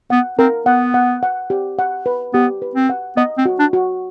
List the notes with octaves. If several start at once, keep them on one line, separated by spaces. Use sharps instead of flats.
B3 F#5
C4 A#4
B3 F#5
F#5
F#5
G4
F#5
B4
B3 G4
B4
C4
F#5
B3 D#5
C4
F#4
D4
F#4